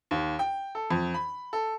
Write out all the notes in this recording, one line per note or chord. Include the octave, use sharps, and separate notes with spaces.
D#2
G5
A4
F2
B5
A4